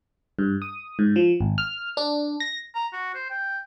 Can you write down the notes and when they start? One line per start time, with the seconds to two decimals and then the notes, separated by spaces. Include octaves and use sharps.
0.39 G2
0.62 D#6
0.99 G#2
1.16 F3
1.40 G#1
1.58 F6
1.97 D4
2.40 A#6
2.75 A#5
2.93 F#4
3.15 C5
3.30 G5